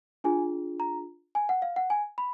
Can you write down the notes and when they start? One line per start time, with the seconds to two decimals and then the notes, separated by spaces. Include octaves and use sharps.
0.24 D4 F4 G#4 G#5
0.80 A#5
1.35 G#5
1.49 F#5
1.62 F5
1.76 F#5
1.90 G#5
2.18 B5